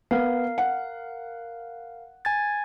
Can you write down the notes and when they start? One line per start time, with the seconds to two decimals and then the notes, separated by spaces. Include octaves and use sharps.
0.11 B3 A#4 F5
0.58 F#5
2.25 G#5 G#6 A6